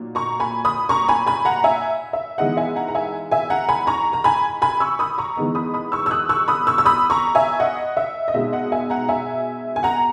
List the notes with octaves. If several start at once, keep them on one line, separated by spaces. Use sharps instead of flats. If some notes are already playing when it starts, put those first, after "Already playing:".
Already playing: A#2 F#3 D#4
A#5 C#6
G#5 B5
B5 D#6
A#5 C#6
G#5 B5
G#5 B5
F#5 A#5
E5 G#5
E5
E3 G#3 B3 D#4 D#5 F#5
E5 G#5
F#5 A#5
A#5
E5 G#5
E5 G#5
F#5 A#5
G#5 B5
A#5 C#6
A#5
G#5 B5
G#5 B5
C#6 E6
B5 D#6
A#5 C#6
E3 G#3 B3 D#4
B5 D#6
B5 D#6
C#6 E6
E6
D#6 F#6
C#6 E6
B5 D#6
C#6 E6
E6
B5 D#6
A#5 C#6
E5 G#5
D#5 F#5
E5
D#5
B2 G#3 B3 D#4 E5
D#5 F#5
E5 G#5
F#5 A#5
E5 G#5
G#5
F#5 A#5